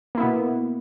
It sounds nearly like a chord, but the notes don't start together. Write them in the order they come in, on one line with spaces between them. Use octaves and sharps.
A#3 E4 B3 B2